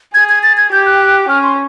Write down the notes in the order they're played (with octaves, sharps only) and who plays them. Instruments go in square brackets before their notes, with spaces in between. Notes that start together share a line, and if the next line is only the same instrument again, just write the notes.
[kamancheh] G#4 [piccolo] G#6
[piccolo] G#6
A6
G#6
[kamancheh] G4 [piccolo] G6
[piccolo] F#6
[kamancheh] C#4 [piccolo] F6
[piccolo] C6